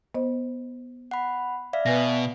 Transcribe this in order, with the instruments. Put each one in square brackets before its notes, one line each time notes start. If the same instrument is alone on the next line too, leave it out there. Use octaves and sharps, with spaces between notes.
[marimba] B3 C5 D#5
[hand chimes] F#5 B5
D5 E5 F5
[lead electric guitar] B2 [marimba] B4 G#5 A#6